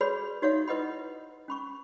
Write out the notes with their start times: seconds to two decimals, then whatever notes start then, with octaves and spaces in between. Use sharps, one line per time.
0.01 F#4 G#4 B4 C#5 D5 B5
0.42 D#4 F#4 C#5 D5 E5 F5
0.68 E4 B4 D#5 F#5 B5
1.48 C#4 B5 C#6